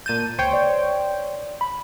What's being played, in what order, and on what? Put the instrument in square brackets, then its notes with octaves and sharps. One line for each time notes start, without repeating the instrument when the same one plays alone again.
[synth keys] A#2 A5 D#7 [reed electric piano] G6
[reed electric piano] C#2 [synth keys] C5 C#5 G5
[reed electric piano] D5
B5